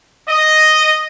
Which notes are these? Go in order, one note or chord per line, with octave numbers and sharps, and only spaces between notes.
D#5